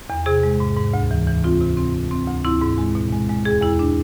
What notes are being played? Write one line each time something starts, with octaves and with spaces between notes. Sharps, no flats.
E2
C3 G#4
G#3
G#2
G#2
D2
E3
E3
C4 F4
C3
C4
C4
C4
D2
C4 E4
G#2
G#3
B2
G#3
G#3
E2 G#4
E2 E4
D4